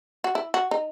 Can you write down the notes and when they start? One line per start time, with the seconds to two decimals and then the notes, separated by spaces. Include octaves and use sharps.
0.24 F#4
0.35 E4
0.54 F#4
0.71 D#4